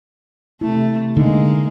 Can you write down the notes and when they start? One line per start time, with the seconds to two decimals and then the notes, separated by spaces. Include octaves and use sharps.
0.61 C3 A3 E4
1.17 D3 G#3 A#3 D#4